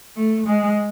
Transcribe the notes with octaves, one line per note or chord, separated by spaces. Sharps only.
A3
G#3